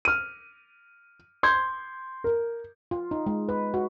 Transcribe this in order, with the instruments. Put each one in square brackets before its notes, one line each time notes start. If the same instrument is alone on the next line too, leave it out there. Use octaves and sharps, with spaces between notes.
[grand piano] F6 D#7
C6 G6 G#6
A#4
[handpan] F4
D#4
G#3
B4
F#4